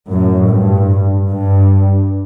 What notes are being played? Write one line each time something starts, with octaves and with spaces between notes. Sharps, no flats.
F#2 A2
G2
G2